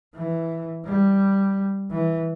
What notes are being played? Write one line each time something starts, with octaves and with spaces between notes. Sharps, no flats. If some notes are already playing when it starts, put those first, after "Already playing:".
E3
G3
E3